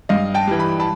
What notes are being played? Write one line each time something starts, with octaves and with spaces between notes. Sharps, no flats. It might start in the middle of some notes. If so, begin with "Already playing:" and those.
G2 D#5 F5
G5 A5
E3 G3
B5
A5 B5